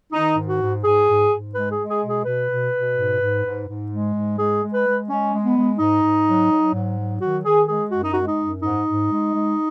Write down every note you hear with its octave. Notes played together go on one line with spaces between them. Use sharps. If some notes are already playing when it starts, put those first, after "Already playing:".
D#3 D#4
G#2
F#4
G#2
G#2 G#4
G#2
G#2
G#3 B4
G#4
G#3
G#4
B2
G#4
B2 B4
B2
B2
G#2
G#2
G#2
G#2
G#3
G#2
G#3 G#4
G#3
B4
G#3
G#3 C#4
G#3
B3
G#3
G#2 D#4
G#2
F#3
F#3
G#2
F#3
D#3 F#4
D#3 G#4
G#3 G#4
F#2 F#4
D#4
G#3 F#4
D#4
F#2
G#2 D#4
G#2
G#3
G#3